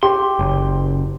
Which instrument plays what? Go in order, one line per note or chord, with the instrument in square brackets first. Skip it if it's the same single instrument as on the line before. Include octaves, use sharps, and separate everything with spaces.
[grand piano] G4 [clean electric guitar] C6
[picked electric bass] F#1